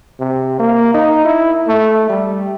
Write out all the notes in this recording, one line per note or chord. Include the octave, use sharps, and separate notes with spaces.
C3
A#3
D#4
E4
A3
G3